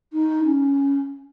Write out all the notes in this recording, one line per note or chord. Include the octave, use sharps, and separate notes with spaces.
D#4
C#4